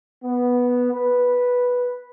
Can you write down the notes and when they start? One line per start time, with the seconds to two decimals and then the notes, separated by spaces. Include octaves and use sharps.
0.23 B3
0.92 B4